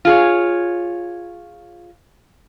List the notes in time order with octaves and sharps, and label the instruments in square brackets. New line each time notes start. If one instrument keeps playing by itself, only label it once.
[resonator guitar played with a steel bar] F4 G#4 C#5